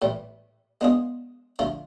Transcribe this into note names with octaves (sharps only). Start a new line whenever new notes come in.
A2 E3 G3
G#3 B3 D4 F4 G#4
D3 F3 A3 D4 F4